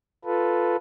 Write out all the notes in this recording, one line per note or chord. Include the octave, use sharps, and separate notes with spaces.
F4 A4 B4